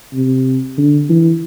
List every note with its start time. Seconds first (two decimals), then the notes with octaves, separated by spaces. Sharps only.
0.14 C3
0.78 D3
1.09 E3